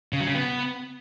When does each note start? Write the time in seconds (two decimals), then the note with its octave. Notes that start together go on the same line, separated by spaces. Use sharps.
0.13 C#3
0.20 F#3
0.27 C#3
0.35 B3